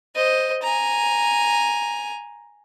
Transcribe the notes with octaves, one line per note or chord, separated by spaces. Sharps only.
C5 D#5
G#5 A#5